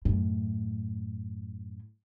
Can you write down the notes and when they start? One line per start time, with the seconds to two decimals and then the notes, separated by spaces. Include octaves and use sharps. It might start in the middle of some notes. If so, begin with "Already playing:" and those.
0.05 F#2 A2